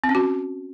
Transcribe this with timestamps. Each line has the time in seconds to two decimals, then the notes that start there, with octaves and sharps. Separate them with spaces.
0.04 C4
0.09 C#4
0.15 F#4